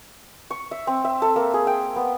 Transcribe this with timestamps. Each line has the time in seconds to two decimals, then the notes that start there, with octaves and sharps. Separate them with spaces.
0.51 C#6
0.71 E5
0.87 C4
1.05 E5
1.22 A4
1.36 A#3
1.54 G#4
1.67 G5
1.96 B3